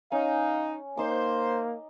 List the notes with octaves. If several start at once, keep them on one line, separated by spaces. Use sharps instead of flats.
C#4 D#4 F5
A#3 D#4 C5 D6